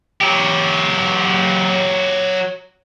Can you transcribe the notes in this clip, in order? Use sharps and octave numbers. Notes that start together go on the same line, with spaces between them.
F#3 G4